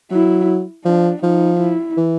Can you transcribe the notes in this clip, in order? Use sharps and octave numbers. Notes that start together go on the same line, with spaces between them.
F#3 E4
F3 D4
F3 D#4
E4
E3